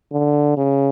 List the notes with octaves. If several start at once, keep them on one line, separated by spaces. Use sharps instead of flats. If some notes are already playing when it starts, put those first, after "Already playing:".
D3
C#3